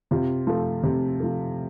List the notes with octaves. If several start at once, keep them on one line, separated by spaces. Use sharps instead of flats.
C3 F4
F3 A3
C3
F3 A3